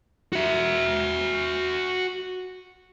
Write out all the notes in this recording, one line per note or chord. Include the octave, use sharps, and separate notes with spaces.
F#4 E5